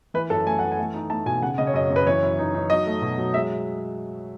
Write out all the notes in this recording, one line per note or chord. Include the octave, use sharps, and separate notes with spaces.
E3 B4
F#2 A4
A3 G#5
E3 F#5
G#5
A3
D#4
A3 A5
B2 G#5
C#3 F#5
C#3 D#5
C#5
F#2 D#5
F#2
B4
E3 C#5
F#2
D#4
D#4
F#3 D#5
A3
B2
F#3
G#3 E5